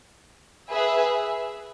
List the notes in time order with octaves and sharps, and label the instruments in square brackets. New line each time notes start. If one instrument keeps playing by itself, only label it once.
[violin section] G#4 B4 E5